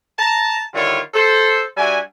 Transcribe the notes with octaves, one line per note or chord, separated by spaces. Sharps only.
A5 A#5
D3 D#3 G3 E4 F4 C#5
A4 C5
G3 D4 F#4 E5 G#5